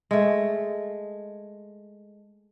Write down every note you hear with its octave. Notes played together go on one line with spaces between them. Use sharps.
G#3 A3